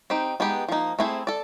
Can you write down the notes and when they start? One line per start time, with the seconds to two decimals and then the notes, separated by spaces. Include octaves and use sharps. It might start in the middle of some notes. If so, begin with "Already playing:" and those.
0.10 C4 D#4 G4
0.40 G#3 B3 D#4 G4 B4
0.68 F3 A#3 D#4
0.99 A3 C4 E4 G#4 C5
1.27 A4 D5